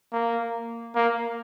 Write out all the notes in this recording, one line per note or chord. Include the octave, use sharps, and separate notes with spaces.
A#3
A#3